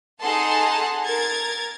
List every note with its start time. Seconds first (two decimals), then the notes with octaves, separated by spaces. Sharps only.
0.22 D#4 G#4 A4 F#5 A5 C6
1.05 A#4 G#6 A6